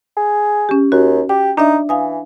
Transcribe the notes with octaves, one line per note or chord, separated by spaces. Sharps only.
G#4
C#4 G4
D#2 F#4
G4 D6
D4 D#4 D5 E5
E3 F5 G#5 D#6